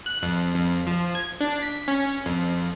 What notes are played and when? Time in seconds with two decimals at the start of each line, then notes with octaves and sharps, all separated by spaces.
0.06 F#6
0.22 F2
0.55 F2
0.87 F3
1.15 G#6
1.41 D4
1.62 B6
1.88 C#4
2.26 F2